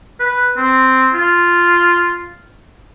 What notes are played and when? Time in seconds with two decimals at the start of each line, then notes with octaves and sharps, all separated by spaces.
0.20 B4
0.57 C4
1.13 F4